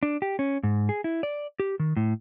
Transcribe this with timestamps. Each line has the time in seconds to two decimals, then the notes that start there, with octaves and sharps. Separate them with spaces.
0.03 D4
0.22 G4
0.39 C#4
0.63 G#2
0.89 G#4
1.04 E4
1.23 D5
1.60 G4
1.80 D#3
1.97 A2